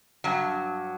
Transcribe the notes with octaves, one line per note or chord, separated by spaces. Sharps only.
G2 F#3